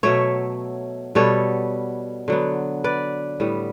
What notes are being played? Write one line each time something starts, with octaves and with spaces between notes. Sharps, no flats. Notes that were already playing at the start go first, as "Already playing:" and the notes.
B2 F#3 A3 C#5 E5
B2 G3 B3 A4 C#5
D3 F#3 B3
B4 D5
A2 G3 B3